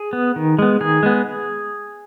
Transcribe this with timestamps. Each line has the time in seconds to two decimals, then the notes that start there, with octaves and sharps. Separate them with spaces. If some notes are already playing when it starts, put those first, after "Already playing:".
Already playing: G#4
0.13 B3
0.36 D#3
0.59 G#3 B3
0.81 D#3 G#4
1.03 G#3 B3